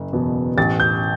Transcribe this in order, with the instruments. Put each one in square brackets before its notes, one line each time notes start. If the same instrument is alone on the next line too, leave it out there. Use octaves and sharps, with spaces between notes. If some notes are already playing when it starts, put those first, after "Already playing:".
Already playing: [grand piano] F#1
E2 B2
A1 A6
G6